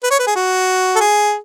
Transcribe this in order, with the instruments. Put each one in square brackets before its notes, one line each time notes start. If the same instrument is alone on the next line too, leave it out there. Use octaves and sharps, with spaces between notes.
[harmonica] B4
C#5
B4
G#4
F#4
A4
G#4